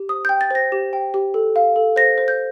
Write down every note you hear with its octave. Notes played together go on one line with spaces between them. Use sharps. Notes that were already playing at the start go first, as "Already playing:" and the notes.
Already playing: G4
C5 D#6
G6
G5
A6
C5 A#6
G4
G5
G4
A4
F5
A4
C5 A#6
C5
G6